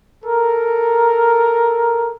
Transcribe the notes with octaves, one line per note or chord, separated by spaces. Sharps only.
A4 A#4